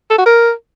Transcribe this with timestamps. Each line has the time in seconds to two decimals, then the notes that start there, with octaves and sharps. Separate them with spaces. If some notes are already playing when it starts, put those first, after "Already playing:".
0.10 A4
0.18 F#4
0.26 A#4